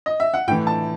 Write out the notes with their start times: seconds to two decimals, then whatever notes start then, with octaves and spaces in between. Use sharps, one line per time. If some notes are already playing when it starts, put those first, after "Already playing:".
0.06 D#5
0.20 E5
0.34 F#5
0.48 A2 G5
0.51 E3
0.67 A5